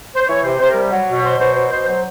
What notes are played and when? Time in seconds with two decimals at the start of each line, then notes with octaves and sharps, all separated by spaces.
0.16 C5
0.27 E3 C#5
0.43 C3 C5
0.60 C3 C5
0.70 G3 A#4
0.91 F#3
1.08 B2
1.23 F#3 C5
1.39 B2 C5
1.55 F#3 C5
1.71 B2 C5
1.87 F#3 C5